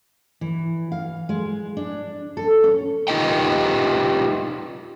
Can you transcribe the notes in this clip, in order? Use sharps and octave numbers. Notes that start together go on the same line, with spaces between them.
E3
F5
G#3
D4
A4
C#4
D#4 F4 G4 B4 D#5 G5